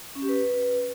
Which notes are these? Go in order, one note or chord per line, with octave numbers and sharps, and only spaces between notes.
C#4
G4
B4